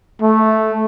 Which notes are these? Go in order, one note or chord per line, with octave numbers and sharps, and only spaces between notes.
A3